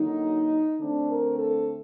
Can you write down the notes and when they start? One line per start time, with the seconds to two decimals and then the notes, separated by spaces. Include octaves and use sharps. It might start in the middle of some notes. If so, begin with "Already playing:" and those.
Already playing: D3 F#3 A#3 D#4
0.79 D3 A3 C4 D4
1.09 A#4
1.39 A4